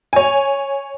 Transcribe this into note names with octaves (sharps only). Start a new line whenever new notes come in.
C#5 G#5